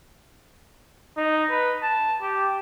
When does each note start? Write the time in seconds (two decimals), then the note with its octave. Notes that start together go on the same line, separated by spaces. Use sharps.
1.17 D#4
1.50 B4
1.82 A5
2.21 G4